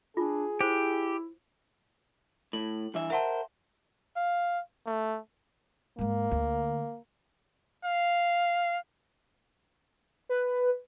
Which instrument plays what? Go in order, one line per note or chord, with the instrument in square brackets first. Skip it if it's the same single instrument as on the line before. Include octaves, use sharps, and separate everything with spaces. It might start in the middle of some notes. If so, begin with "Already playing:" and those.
[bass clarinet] D4 [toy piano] F4 [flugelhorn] G#4
[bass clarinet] E4 [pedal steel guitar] G4 [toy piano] C5
[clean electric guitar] A2 [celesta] F#7
[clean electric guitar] G2 E3 E5
[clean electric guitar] A#4 C5 [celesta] E5 F#5 A5
[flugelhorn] F5
A3
[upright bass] G#2 G#3 [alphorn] A#3
[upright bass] D2
[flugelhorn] F5
[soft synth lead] B4